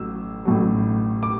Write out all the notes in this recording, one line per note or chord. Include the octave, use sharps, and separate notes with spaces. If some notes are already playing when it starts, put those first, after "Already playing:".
Already playing: A1 A2 F#3 E6
A1 A2 F#3
D6